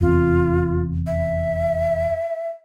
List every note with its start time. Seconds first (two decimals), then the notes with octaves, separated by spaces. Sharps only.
0.01 F1 E2 C4 F4
1.07 E5